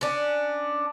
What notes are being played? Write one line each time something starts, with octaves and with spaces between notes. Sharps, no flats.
C#4 D4